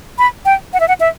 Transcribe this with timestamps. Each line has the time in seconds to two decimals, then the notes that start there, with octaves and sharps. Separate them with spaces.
0.18 B5
0.45 G5
0.73 F#5
0.80 E5
0.88 F#5
1.00 E5